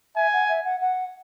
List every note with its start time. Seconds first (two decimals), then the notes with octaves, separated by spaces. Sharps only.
0.16 E5 G#5
0.33 F#5
0.49 E5
0.65 F#5
0.81 F#5